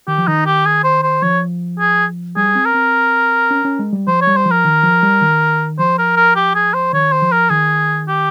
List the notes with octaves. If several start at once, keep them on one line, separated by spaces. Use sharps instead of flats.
D#3 G4
F3
D#3 D#4
G4
G#4
C5
C5
F3 C#5
G#4
G3 G#4
C4
A#4
C4
C#4
C#4
G#3
G3
F3 C5
C#5
G3
C5
F3
A#4
D#3
F3
G3
D#3
F3 C5
A#4
A#4
G4
G#4
C5
D#3 C#5
C5
F3
A#4
D#3 G#4
G4